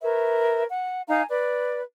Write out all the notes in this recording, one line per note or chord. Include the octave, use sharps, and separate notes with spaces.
A#4 B4 C#5 E5
F#5
D#4 F5 G#5 A#5
B4 D5